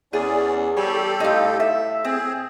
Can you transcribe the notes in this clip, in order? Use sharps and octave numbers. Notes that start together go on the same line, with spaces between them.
E2 C#4 G#4 D5
G3 G4 A4 C#5
A2 D#4 F4
E5
C4 G#4